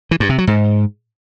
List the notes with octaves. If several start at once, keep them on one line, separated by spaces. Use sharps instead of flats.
E3
G2
C3
F#3
G#2